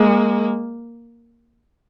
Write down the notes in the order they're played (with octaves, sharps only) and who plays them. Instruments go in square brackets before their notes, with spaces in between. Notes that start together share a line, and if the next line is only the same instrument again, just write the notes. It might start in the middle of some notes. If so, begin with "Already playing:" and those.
Already playing: [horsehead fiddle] G#3 [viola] A#3